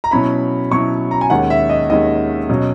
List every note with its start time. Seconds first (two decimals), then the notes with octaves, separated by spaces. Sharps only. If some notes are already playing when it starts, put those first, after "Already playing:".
0.04 A#5
0.11 B2 F#3 C#4 E4 B5
0.71 B2 F#3 C#4 E4 C#6
1.11 A#5
1.21 G#5
1.30 D#2 D#3 G#3 C#4 F#5
1.50 E5
1.70 D#5
1.90 D#2 D#3 G#3 C#4 D#5
2.49 B2 F#3 C#4